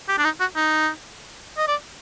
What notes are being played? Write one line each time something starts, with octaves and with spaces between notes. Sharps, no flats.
G4
D4
D#4
F#4
D#4
D#5
D5